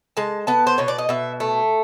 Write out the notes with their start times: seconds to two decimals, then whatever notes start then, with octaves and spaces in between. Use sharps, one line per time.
0.17 G#3 A5
0.47 B3 A5
0.67 C5
0.78 B2 C#5
0.88 D5
0.98 D#5
1.09 B2 E5
1.40 A3